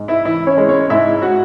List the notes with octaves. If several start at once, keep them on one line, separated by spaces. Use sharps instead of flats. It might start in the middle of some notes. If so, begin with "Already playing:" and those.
Already playing: G#2
E4 E5
E3 E4 E5
C#4 C#5
G#3
C#4 C#5
G#2 E4 E5
F#4 F#5